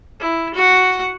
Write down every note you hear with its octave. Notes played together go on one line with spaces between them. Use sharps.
E4
F#4 F#5